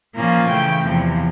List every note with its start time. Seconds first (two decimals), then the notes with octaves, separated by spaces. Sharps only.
0.14 A#2 F3 A#3 C#4 F4
0.49 C#3 E3 A3 G5
0.84 E2 C3 F3